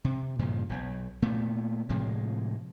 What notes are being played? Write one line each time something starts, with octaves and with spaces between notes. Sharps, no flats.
C3
G2 A#2 C#3 F3
E1 B1
A#2 A3 B3
A2 C3 F3 G#3